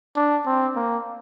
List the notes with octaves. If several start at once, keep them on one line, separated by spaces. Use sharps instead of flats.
D4
C4
A#3